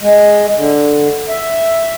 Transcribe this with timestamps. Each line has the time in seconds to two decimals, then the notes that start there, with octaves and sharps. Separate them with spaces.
0.02 G#3
0.57 D3
1.29 E5